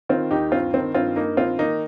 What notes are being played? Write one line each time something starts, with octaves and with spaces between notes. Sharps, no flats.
D#3 C4 F4
D#2 D#4 G4
G2 C4 F4
D#3 C4
G2 C4 F4
G2 A#3 D#4
D#3 C4 F4
D#3 A#3 D#4